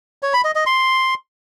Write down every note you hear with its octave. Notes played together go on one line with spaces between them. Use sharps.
C#5
B5
D#5
D#5
C6